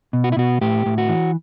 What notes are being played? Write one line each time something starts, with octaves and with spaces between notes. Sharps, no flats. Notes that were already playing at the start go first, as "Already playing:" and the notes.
B2
F#4
E4
B2 F#4
A2 G4
A2
F#4
E3